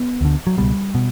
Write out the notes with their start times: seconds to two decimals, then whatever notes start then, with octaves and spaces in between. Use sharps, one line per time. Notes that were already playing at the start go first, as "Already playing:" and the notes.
Already playing: B3
0.21 D2 D3
0.47 F#3
0.58 C#2 B2 G3
0.95 B2